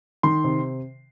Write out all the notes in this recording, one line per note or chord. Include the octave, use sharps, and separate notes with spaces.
D#3 C6
C3